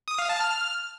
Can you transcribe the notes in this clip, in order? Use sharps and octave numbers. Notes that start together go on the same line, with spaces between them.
D#6
F5
A5
F6